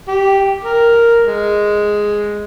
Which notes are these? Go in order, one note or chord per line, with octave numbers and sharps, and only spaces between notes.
G4
A#4
G#3